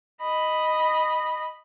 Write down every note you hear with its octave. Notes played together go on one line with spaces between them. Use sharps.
D#5 B5